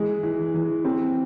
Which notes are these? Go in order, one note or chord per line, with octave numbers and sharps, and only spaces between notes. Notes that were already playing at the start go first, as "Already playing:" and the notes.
Already playing: E3 G#3
E3
E3
C4